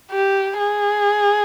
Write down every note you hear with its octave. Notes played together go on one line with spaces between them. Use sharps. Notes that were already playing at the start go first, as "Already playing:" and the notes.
G4
G#4